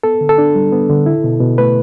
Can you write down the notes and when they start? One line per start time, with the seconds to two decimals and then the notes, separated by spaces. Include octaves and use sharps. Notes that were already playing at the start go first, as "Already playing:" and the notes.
0.03 B3 A4
0.21 D3
0.29 A4
0.38 D4
0.55 G3
0.72 B3
0.89 D3
1.06 E4
1.24 B2
1.41 B2
1.58 A3 B4